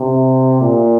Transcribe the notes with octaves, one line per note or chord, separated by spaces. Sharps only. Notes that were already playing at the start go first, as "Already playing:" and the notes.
Already playing: C3
A#2